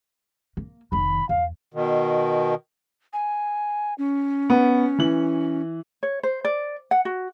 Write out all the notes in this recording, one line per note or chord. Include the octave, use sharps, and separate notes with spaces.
A#3
F1 D#3 B5
E2 F5
B2 D#3
G#5
C#4
B3
E3 F#7
C#5
C5
D5
F#5
F#4